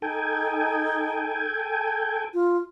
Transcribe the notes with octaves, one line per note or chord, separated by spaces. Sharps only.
D#4 A4 G5 G#5
F4